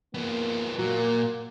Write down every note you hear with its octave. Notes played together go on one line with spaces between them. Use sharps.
F3 A#3 B3
A#2 F#3 A#3 A#4